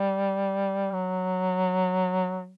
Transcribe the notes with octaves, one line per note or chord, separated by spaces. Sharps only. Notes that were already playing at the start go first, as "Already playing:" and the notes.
Already playing: G3
F#3